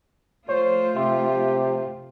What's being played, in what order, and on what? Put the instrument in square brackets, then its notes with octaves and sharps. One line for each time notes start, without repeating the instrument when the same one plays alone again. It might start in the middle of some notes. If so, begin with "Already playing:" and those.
[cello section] F3 A3 F4 [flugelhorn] C5 [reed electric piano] C#5
[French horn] C3 [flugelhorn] G4 [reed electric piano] E5 C6